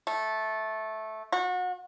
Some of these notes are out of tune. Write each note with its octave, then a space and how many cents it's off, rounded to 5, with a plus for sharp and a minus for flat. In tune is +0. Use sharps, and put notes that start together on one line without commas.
A3 -10
F#4 -30